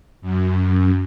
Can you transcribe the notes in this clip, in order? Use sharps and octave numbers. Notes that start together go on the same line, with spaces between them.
F#2